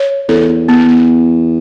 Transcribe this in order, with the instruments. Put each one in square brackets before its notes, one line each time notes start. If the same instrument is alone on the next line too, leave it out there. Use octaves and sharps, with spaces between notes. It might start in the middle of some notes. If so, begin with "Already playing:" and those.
Already playing: [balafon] C#5
[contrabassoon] E2 [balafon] A4
[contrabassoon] E2
[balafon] B3